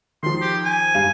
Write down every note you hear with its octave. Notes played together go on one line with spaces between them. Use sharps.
D#3 F3 C6
G4
G#5
G2 F5 D#7